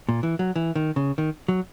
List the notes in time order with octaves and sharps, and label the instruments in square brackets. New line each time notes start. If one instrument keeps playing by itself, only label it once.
[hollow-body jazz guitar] A#2
E3
F#3
E3
D#3
C#3
D#3
F#3